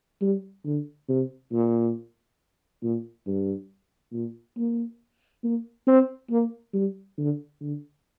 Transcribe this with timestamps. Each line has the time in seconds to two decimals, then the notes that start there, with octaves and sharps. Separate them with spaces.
0.22 G3
0.65 D3
1.09 C3
1.52 A#2
2.83 A#2
3.27 G2
4.13 A#2
4.57 A#3
5.44 A#3
5.87 C4
6.30 A#3
6.74 G3
7.18 D3
7.61 D3